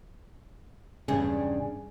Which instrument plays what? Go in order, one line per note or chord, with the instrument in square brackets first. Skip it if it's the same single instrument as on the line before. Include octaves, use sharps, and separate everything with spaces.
[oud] E2 G2 G#4 [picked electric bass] C#3